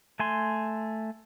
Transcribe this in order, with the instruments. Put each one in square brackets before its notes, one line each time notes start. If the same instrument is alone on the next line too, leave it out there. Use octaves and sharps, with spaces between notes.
[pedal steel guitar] A3 G#5 C6